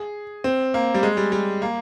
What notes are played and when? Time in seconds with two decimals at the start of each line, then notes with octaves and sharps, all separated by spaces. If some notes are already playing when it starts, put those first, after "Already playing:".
Already playing: G#4
0.44 C4
0.74 A#3
0.94 G3
1.03 G#3
1.17 G3
1.32 G3
1.62 A#3